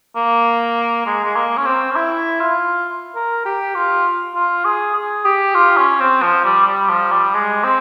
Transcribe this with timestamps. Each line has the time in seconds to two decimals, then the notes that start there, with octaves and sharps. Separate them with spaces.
0.16 A#3
1.06 G#3
1.24 G#3
1.36 A#3
1.57 C#4
1.66 C4
1.91 C#4
1.96 E4
2.41 F4
3.15 A#4
3.45 G4
3.75 F4
4.35 F4
4.65 G#4
4.95 G#4
5.25 G4
5.55 F4
5.77 C#4
6.00 C4
6.22 F3
6.44 G3
6.67 G3
6.89 F3
7.12 G3
7.35 G#3
7.64 C4